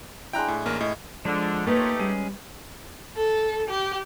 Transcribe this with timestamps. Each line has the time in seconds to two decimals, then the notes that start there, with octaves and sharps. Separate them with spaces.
0.33 G#3 D4 E4 G5 A#5 F#6
0.48 A2
0.66 A1 A#3 C#6 F6
0.81 A2 D#5
1.25 D3 F3 G#3 D4
1.67 A3 A#3 D#4 F4 G4 B4 C#5
1.99 G3 G#3 C#4 G#4
3.15 A4
3.69 G4